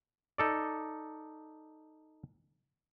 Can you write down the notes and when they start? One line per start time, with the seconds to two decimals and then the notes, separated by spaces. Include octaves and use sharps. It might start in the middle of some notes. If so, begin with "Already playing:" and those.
0.38 D#4 A4 D5